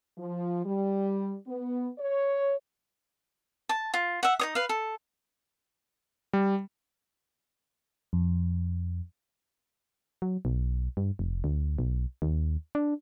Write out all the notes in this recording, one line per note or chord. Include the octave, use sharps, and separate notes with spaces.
F3
G3
B3
C#5
A5
F4
E5 F#5
D#4 C#5 D#6
B4 F5
A4
G3
F2
F#3
B1
G2
F1
D2
B1
D#2
D4